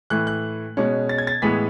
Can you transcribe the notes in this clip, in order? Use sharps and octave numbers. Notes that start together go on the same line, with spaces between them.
A2 E3 A3 F#6
F#6
B2 G#3 C#4
A6
G#6
A6
A2 E3 G#3 B3 B6